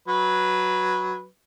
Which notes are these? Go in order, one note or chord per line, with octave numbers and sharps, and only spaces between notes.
F#3 B4